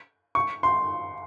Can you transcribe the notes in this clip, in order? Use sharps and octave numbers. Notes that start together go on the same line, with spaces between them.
C#6
C6